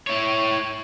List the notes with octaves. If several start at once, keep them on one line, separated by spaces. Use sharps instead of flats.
E4 C#5